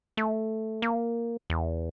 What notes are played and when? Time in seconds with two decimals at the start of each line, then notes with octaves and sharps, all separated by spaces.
0.17 A3
0.82 A#3
1.50 E2